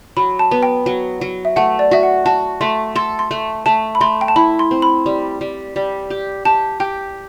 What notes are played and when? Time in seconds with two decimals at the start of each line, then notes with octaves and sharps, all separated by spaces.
0.17 F#3 B5
0.39 A5
0.51 B3
0.63 G5
0.86 F#3
1.21 F#3
1.45 E5
1.56 A3 F#5
1.79 D5
1.91 F#4 E5
2.03 F#5
2.26 F#4 A5
2.61 A3 C6
2.96 A4 C6
3.19 C6
3.31 A3
3.66 A3 A5
3.95 B5
4.01 A3 C6
4.21 G5
4.28 A5
4.36 E4 B5
4.59 C6
4.71 C4
4.82 B5
5.06 G3
5.41 G3
5.76 G3
6.10 G4
6.45 G4 A5
6.80 G4 G5